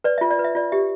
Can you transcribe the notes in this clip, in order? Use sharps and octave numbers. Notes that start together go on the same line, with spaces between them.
B4 D5
F4 E5
D5
B4
E5
F4 D5
G4 E5